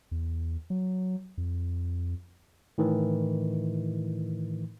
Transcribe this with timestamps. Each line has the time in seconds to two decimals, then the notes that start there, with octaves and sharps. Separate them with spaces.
0.11 E2
0.70 F#3
1.38 F2
2.78 A2 D#3 E3